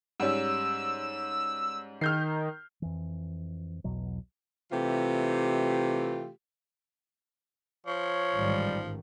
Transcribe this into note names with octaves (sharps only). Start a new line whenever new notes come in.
G#2 G3 C#4 E6
D#3 F6 G6 C7
F2 E3
B1 E2 B2 F#3
C3 E3 A3 F4 G4
F3 C#5
A1 G#2 D#3 G3